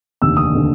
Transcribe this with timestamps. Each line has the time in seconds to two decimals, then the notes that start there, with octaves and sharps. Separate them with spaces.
0.22 F1 D#2 D3 E6
0.37 D#6
0.55 D3